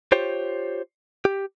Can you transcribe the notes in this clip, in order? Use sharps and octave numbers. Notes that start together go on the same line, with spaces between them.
F4 G4 C5 C#5
G4